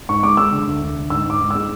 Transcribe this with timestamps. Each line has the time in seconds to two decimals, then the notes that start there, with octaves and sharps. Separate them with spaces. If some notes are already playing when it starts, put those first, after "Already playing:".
0.08 G#2 C#6
0.23 G#3 D6
0.37 G#3 E6
0.52 D3
0.67 D2
0.82 D2
0.96 D3
1.10 G#2 E6
1.25 G#2 D6
1.41 G#2
1.51 G#3 E6